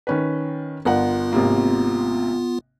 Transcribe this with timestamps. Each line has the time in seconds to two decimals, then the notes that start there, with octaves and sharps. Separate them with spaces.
0.07 D#3 C#4 B4
0.85 G1 B3 F4 A#4 F#5
1.33 G#1 C3 A#3